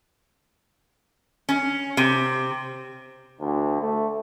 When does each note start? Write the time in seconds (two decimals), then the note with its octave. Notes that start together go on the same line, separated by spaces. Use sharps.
1.49 C#4
1.97 C3
3.40 D2
3.82 A3